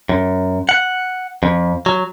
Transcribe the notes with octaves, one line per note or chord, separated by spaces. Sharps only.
F#2
F#5
F2
F#3